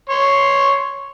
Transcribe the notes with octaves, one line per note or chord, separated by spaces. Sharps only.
C#5 C6